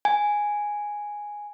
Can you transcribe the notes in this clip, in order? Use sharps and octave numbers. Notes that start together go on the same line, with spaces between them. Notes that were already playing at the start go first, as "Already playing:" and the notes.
G#5